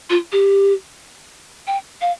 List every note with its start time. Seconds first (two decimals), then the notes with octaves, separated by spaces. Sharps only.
0.10 F4
0.32 G4
1.67 G5
2.01 F5